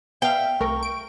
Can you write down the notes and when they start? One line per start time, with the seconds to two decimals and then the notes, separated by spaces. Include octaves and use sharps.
0.22 B3 E5 F5 G5
0.60 C2 A3 A#4 C#6
0.83 D7